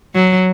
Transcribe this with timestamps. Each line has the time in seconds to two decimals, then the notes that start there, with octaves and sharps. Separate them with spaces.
0.15 F#3